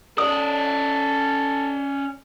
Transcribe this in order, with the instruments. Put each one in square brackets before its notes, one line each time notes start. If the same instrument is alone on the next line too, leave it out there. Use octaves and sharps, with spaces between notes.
[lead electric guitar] C#4 D5 [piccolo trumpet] A4 [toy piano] D#6